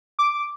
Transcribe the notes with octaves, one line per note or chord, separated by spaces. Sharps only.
D6